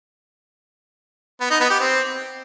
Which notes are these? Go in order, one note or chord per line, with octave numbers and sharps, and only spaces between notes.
B3
D#4
B3
G4
C4